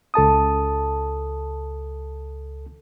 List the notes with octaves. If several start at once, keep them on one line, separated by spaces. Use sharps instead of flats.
C#2 A4 A5 D#6